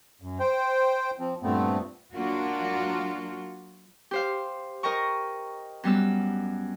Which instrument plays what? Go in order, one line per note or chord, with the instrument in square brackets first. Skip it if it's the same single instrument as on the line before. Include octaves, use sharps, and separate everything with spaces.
[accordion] F#2
C5 G5
F3 C4
G2 A#2 A3 B3 C4
[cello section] F#3 A#3 D4 F4 F#4
[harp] G4 C5 F5
A#4 D#5 G5 A#5 C#6
F#2 G3 B3 E6